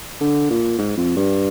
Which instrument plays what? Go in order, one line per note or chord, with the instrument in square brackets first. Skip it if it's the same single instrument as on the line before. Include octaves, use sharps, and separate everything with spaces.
[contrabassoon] D3
A#2
G#2
F2
G2